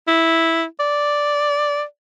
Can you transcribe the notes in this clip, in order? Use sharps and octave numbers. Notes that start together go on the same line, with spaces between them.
E4
D5